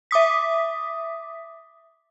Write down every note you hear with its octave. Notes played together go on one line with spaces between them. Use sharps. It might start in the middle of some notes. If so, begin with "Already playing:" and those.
E5 D6 D#6 B6